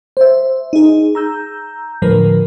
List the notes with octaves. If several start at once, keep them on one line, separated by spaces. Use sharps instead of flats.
C5 E5
D#4 G#4
A#5 E6 G6
A2 D3 F3 A#4 B4